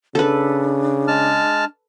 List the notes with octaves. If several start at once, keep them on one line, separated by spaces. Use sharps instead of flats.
C#3 D4 A4 B4
G#3 A5 F6